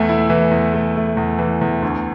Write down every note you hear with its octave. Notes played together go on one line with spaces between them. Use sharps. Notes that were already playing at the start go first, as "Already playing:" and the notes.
Already playing: E2 E3 A3
E4
E3
E2
A3
A3
E2
E3
E2
D2